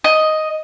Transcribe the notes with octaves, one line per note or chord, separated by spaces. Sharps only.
D#5